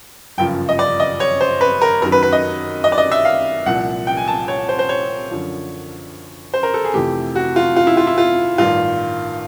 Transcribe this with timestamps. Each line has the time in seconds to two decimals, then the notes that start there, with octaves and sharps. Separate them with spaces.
0.38 G1 F#2 C#3 F3 G5
0.69 D#5
0.79 D5
1.00 D#5
1.20 C#5
1.41 C5
1.61 B4
1.82 A#4
2.02 F#2 A#4
2.05 D#3 F#3
2.12 B4
2.23 B4
2.32 D#5
2.84 D#5
2.92 D5
2.98 D#5
3.12 E5
3.25 F5
3.66 C2 A#2 F3 F#5
4.07 G5
4.17 G#5
4.28 A5
4.48 C#5
4.69 C5
4.79 C5
4.89 C#5
5.30 F#2 D3 F3
6.54 C5
6.63 A#4
6.74 A4
6.84 G#4
6.94 F2 C3 E3 A3 G4
7.36 F#4
7.56 F4
7.76 F4
7.87 E4
7.97 F4
8.07 E4
8.18 F4
8.58 A1 G2 D#3 F4